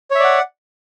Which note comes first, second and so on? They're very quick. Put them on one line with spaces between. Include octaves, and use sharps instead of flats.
C#5 E5 D5 F#5